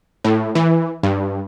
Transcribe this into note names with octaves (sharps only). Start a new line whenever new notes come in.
A2
E3
G2